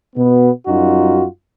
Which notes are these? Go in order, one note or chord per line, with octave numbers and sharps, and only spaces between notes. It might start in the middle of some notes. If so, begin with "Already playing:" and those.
B2 B3
F#2 G3 D#4 F4 F#4